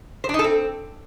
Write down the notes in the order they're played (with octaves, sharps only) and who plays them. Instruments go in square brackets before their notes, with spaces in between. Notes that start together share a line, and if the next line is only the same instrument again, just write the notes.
[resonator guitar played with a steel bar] C5
D4
D#4
A4
C4